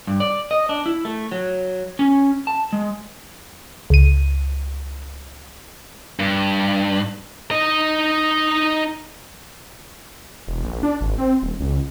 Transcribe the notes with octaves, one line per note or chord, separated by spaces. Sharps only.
G2
D5
D#5
D4
E4
A3
F#3
C#4
A5
G#3
C#2 D#7
G2
D#4 D#5
E1
A#1
D4
G#1
C4
D#1
C#2